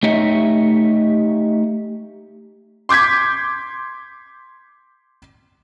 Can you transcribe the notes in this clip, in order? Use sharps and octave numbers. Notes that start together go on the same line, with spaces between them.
A3 D#4 G4 C#5 D#5 E5
C6 D6 G6 G#6 B6